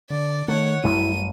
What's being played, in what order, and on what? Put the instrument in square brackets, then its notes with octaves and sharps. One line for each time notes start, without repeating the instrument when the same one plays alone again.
[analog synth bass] D3 [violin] D5
[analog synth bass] D#3 [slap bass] A3 [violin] C#5 F#5
[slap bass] A1 F#2 G3 [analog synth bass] E4 [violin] D#7